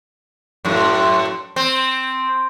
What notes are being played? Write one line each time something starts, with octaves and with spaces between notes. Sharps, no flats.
F#2 A2
C4